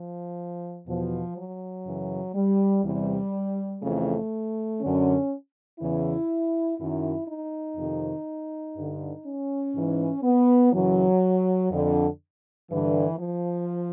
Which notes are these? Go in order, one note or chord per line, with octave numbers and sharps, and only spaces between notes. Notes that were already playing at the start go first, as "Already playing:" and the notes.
Already playing: F3
E2 B2 F3
F#3
F#2 C#3 E3
G3
E2 C3 E3 G3
F2 C#3 E3 A3
F#2 D3 C#4
E2 C#3 E3 E4
F#2 D#3 E4
D#4
F2 C3 D#3
G2 D3
C#4
G#2 E3
B3
F#2 C#3 E3 F#3
F2 D3
G2 D3 E3
F3